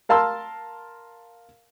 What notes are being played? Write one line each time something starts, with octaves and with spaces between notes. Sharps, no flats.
A#4 F5 A5 C6 E6 F6